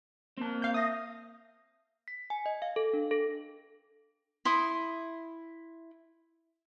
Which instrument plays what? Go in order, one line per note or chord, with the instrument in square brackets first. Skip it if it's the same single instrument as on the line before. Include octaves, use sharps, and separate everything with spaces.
[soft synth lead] A#3 [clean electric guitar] C4 A5
[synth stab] F5 G6
[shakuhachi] E5 [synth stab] D#6 A#6
[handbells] B6
G#5
D#5
F5
A4
D4
A4
[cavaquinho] E4 C6 D#6